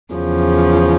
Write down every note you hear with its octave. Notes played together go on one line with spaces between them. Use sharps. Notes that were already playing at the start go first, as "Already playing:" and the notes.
E2 C#3 F3